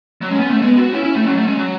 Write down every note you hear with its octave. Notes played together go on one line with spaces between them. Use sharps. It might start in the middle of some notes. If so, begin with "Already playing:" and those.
F#3
G#3 C#4
B3
A3
G#3 B3
F#4
C#4 E4
E4
A3
F#3 C#4
A3
G#3
F#3